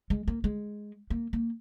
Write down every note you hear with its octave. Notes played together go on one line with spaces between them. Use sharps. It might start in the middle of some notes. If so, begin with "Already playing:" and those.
G#3
A#3
G#3
A#3
A#3